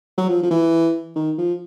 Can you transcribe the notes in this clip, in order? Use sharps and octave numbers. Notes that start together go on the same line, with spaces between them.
F#3
F3
F3
E3
D#3
F3